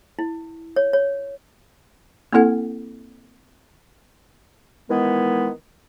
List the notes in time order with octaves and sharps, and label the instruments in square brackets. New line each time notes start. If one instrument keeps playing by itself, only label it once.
[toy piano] E4
C#5
C#5
[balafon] A#3 C4 E4 A4 F#5
[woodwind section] D#3 E3 G#3 B3